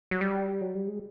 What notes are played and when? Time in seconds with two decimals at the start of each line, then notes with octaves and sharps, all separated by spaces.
0.11 F#3
0.21 G3
0.61 F#3
0.75 G3
0.88 G#3